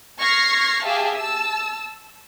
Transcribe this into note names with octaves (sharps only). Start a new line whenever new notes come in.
C#6 F6 G#6 A#6 C7
G4 G#4 E5 F5 A5
A5 E6